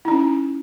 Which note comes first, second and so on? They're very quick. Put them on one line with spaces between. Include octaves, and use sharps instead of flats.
E4 D#4 C#4